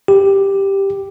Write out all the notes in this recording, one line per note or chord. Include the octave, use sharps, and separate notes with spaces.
G4